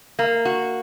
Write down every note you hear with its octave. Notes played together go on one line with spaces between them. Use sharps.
A#3
F#4